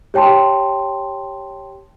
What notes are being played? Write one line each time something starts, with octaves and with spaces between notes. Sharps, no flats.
G4 C#5 G5 A5 C6